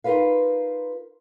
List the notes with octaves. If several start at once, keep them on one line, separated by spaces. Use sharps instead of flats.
D#4 F4 G4 A#4 B4 F5